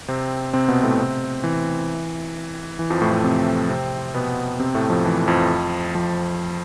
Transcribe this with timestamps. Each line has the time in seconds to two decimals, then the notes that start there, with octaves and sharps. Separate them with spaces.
0.08 C3 C4
0.53 C3 C4
0.68 B2 B3
0.83 A2 A3
0.99 C3 C4
1.44 E3
2.79 E3
2.90 F2 F3
3.02 A2 A3
3.12 A2 A3
3.24 C3 C4
3.69 C3 C4
4.14 B2 B3
4.59 C3 C4
4.75 A2 A3
4.89 F2 F3
5.05 E3
5.28 F2 F3
5.95 F2 F3